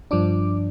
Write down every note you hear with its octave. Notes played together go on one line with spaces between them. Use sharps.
G2 F3 D4 D6